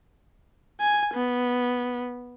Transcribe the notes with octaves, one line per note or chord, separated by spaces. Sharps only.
G#5
B3